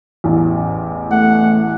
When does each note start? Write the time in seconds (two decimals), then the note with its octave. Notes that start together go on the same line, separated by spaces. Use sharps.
0.24 A1 E2
1.12 A3 F#5